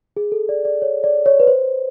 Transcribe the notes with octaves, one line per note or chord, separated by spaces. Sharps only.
G#4
A4
D5
D5
C#5
D5
C#5
B4
C5